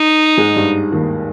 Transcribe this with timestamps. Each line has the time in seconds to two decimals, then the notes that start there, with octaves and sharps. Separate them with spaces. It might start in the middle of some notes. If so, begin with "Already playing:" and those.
Already playing: D#4
0.38 G#2 G#3
0.56 G2 G3
0.92 D#2 D#3